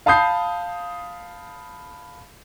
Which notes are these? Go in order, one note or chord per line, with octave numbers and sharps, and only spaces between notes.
F5 A5 B5 D#6 G6 C7